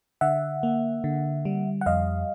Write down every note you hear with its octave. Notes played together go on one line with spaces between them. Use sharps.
D3 E5 F#5
A#3
D3
G3
F#5
F2 D#5 F5